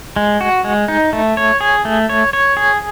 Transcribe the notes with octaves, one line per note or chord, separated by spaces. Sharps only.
G#3
F#4
G#3
D#4
A3
C#5
G#4
A3
C#5
C#5
G#4